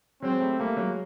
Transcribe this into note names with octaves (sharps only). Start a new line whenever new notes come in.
F#3 G#3 C4
G3 A3
G3 A3 A#3
F#3 G#3